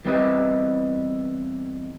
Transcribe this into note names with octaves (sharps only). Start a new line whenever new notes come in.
E2 G3 C4 E4 B4 D#5